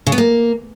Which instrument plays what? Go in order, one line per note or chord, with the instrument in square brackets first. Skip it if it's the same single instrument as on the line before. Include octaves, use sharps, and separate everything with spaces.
[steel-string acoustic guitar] C#3
B3
A#3